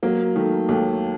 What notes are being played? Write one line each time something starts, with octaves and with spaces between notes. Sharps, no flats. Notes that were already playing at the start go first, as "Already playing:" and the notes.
F#3 A#3
D#3 A3
D#2 A3